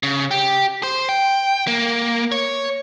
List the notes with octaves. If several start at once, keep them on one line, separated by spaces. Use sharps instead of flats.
C#3
G4
C5
G5
A#3
C#5